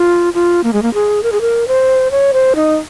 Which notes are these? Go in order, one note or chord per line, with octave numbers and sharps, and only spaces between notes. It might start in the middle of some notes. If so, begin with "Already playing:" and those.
Already playing: F4
F4
A#3
G#3
A#3
G#4
A#4
G#4
A#4
C5
C#5
C5
D#4